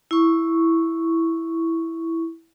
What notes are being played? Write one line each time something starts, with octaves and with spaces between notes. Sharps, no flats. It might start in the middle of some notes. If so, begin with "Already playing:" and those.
E4 C#6